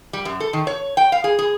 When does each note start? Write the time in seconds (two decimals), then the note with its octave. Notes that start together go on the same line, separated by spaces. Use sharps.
0.13 G3
0.25 F#2
0.40 A4
0.53 D#3
0.67 C#5
0.97 G5
1.12 F5
1.24 G#4
1.39 G#4